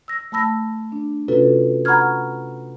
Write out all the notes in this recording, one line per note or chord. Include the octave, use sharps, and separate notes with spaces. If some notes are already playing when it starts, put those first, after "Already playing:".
E6 A#6
A3 A5 B5 E6 A#6
D4
C3 C#4 F4 F#4 A4 B4
F#5 A#5 B5 C#6 F6 G#6